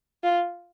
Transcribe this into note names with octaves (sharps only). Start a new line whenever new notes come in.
F4